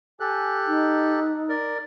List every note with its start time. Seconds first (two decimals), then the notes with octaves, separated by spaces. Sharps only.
0.20 G4 A4 G#5 F#6
0.67 D#4
1.49 A#4 D5